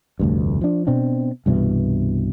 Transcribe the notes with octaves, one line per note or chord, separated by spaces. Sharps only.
F1 D2 G2
F3 D4
B2 C4 D4
C2 G2 B2 E3